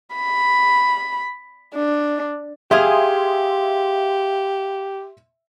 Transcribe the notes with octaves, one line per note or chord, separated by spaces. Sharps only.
B5
D4
G4 G#4 E5 F5 C6 D#6 G#6